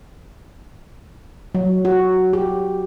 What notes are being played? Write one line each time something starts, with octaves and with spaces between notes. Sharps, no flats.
F#3
F#4
G4